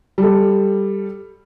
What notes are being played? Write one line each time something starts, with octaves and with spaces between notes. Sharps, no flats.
G3 A4